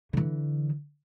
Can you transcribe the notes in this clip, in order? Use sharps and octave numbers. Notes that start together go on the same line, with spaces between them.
D3 E3